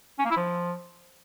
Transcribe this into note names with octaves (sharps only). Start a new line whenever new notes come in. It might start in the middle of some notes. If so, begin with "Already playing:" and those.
C#4
A#3
E4
F3